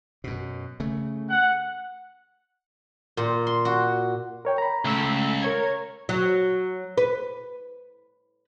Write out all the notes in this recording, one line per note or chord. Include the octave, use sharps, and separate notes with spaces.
F#2 B2
C#3 A3
F#5
A#2
C6
F#4
A#4 C#5 G5
A#5 B5
C#2 A3 E6 B6
A#4 C#5 G#6
F#3
B4